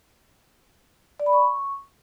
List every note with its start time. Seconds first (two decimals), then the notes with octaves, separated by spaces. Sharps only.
1.20 D5
1.26 B5
1.33 C#6